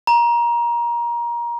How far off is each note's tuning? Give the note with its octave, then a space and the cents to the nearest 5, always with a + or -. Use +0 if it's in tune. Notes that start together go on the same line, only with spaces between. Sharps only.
A#5 +25